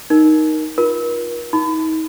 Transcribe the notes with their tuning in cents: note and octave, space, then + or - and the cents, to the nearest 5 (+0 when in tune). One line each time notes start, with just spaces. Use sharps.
D#4 +0 A#4 +10
F4 +5 A#4 +40
D#4 +40 B5 +35